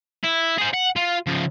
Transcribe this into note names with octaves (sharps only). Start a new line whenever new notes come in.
E4
G#4 C5
F#5
F4
C#3 F3